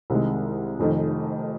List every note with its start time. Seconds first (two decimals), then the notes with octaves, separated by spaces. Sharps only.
0.10 C2 C3 D#3 G#3
0.79 F1 F2 D#3